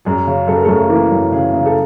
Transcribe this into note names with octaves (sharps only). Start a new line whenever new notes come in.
F#2 G#4
C#3
F#2 A4
A#4
A3 A4
F#2
A4
E3 A#3 A#4
F#2
C#3 G#4
C#3
A4